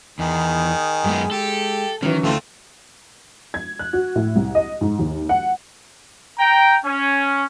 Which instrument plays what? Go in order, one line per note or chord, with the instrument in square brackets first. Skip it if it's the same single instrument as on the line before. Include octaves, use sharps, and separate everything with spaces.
[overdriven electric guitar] E2 [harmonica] D#3 G#4
[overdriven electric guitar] F#2 B3 [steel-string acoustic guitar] G#3
[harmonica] G4 [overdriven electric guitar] A4
[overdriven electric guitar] D#3 [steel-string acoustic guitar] E3 F#3 C#4
[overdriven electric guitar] D2 D3 [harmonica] A3 C4 F4
[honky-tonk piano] G#6
F#6
F#4
A2
C2
D#5
G#2
D#2
F#5
[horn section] G5 A#5
C#4